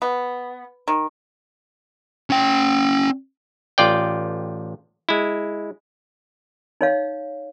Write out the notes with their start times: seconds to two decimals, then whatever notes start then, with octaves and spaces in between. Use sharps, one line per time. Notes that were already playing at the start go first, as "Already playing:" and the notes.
0.02 B3
0.88 D#3
2.30 C#4 G5
3.78 A1 F4 D5 G5
5.09 G#3 E4
6.81 D#4 C#5 F5